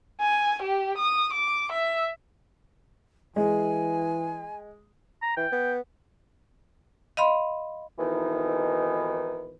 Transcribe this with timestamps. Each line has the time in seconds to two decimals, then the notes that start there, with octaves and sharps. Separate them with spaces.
0.21 G#5
0.62 G4
0.98 D#6
1.33 D6
1.72 E5
3.36 E3 G#3 G#5
5.22 A#5
5.37 E3 G5
5.52 B3
7.17 D#5 F5 B5 C6
7.98 F2 G#2 B2 D#3 E3